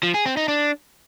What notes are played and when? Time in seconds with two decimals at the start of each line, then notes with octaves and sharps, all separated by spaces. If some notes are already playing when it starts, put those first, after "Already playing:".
0.03 F3
0.14 G#4
0.26 C4
0.37 D#4
0.48 D4